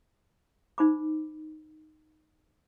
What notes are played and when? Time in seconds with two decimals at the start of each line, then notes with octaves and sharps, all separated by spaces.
0.78 D#4 C5 B5 D6